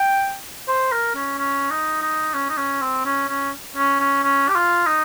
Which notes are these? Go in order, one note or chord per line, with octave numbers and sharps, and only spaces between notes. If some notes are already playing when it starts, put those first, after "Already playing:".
Already playing: G5
C5
A#4
C#4
C#4
D#4
D#4
C#4
D#4
C#4
C4
C#4
C#4
C#4
C#4
C#4
G4
F4
D#4